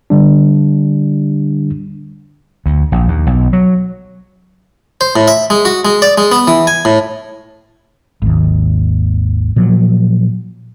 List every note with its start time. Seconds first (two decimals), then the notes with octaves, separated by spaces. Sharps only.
0.10 D3 G3 D4
2.66 D2
2.92 A#1
3.08 D#2
3.27 B1
3.53 F#3
5.01 C5
5.16 A2
5.28 E5
5.50 G#3
5.65 F#4
5.85 G#3
6.02 D5
6.18 G#3
6.32 B3
6.47 E3
6.67 G#5
6.85 A2
8.22 G#1 D#2
9.56 A#2 F3 F#3